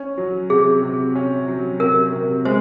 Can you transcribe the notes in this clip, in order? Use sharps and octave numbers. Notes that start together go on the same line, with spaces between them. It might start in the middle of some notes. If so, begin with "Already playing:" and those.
Already playing: C#4
F#3
C3 G#4
C3
C#4
F#3
C3 A#4
C3
G#3 C5